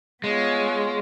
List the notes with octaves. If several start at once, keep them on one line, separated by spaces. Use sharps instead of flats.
G#3 B3 F4 C#5